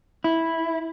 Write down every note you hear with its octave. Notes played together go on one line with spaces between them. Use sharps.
E4